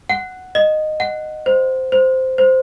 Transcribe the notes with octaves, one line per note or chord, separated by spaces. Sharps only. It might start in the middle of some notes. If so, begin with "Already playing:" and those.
F#5
D#5
F#5
C5
C5
C5